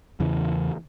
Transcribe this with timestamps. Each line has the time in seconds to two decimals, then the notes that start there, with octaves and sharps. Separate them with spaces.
0.20 E2 C#3 E3